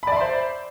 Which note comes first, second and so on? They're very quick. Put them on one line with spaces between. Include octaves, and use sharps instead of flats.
B5 D5 E5 C6 C5